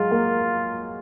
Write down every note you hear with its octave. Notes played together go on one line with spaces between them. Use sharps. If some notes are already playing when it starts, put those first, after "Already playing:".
Already playing: F#3 G#3 F4
A#3